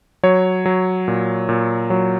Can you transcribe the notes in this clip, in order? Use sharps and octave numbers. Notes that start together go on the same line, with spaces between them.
F#3 C#5
F#3
A#2
A#2
F#3